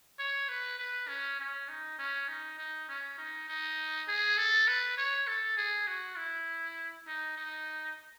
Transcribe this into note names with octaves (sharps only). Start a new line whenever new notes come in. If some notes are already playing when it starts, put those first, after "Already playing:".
C#5
B4
B4
C#4
C#4
D#4
C#4
D#4
D#4
C#4
D#4
D#4
G#4
A4
B4
C#5
A4
G#4
F#4
E4
D#4
D#4